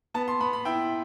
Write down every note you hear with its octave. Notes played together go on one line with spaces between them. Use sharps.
B3 A5
C6
B3 B5
B5
E4 G5